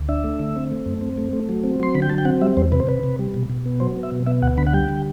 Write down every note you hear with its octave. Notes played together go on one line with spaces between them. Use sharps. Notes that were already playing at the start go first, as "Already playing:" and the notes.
Already playing: D2
D4 E5
A3
D3
C4
A3
F#2
C4
A3
A3
F#3
C4
F#3 C6
D3 B5
G5
F#3 A5
G5
C4 F#5
G3 E5
E2 C5
C3 B4
C5
C3 B4
C3
G3
B2
B2
B3
F#3 C5
B3
E5
B2
B3 E5
D2 F#5
D3 B5
F#5
G3 G5
D3